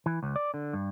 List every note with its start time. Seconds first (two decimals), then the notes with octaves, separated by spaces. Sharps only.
0.06 E3
0.23 C#2
0.36 D5
0.54 D3
0.73 G2